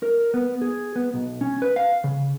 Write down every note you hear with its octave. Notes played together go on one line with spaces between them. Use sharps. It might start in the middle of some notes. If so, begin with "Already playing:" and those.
A#4
B3
G#4
B3
B1
C#4
B4
F5
C#3